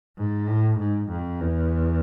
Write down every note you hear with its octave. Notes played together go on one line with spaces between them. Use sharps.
G#2
A2
G#2
F2
E2